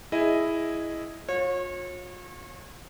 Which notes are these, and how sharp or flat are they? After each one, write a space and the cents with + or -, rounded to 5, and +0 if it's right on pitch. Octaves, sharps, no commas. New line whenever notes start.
E4 +0 G#4 +0 D#5 +0
F4 +45 C#5 -30